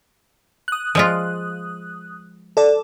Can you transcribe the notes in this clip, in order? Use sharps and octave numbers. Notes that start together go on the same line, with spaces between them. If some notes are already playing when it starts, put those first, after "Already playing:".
D#6 F#6
F3 G#3 F4
A4 D5